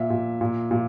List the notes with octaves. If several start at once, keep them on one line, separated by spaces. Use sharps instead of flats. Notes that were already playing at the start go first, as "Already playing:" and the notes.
Already playing: A#2 E5
A#2
A#2
A#2